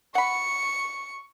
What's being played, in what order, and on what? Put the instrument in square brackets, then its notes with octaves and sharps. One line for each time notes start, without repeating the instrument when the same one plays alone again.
[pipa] F#5 B5 [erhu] C#6 [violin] C#7